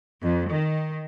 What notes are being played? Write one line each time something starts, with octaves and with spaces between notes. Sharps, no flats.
F2
D#3